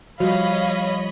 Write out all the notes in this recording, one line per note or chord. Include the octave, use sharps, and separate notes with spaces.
F3 G3 F#4 C#5 D#5 F5 B5